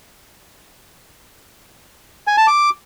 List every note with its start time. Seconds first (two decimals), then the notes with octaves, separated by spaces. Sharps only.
2.27 G#5
2.37 A5
2.47 D6